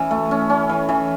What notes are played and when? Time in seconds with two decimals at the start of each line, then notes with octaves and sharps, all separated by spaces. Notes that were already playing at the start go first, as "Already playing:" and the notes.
Already playing: E3 C#4
0.11 A3
0.31 C#4
0.50 C#4
0.69 E3
0.89 E3